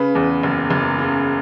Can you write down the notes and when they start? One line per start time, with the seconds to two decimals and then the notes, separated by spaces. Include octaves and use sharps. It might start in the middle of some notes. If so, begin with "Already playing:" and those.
Already playing: C#3 B4
0.15 E2
0.43 F#1
0.70 F#1
0.99 C#3